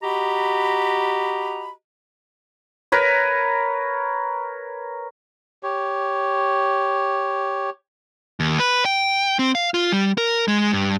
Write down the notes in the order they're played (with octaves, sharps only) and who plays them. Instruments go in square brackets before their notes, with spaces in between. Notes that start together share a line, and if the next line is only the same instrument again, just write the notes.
[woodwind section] F#4 G4 D#5 A#5 B5
[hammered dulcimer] A#4 B4 C#5
[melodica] G4 C#5
[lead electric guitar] D#2
B4
G5
C4
F5
F4
G3
A#4
G#3
G2